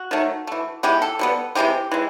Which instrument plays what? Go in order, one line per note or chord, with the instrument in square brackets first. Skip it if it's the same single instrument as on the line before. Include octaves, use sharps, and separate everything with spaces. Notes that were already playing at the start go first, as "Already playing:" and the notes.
Already playing: [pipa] F#4
D#3 F#3 A3
E3 A3
E3 G#3 B3 G4
A4
B2 G3 B3
C3 E3 G#3 B3 G4
E3 G#3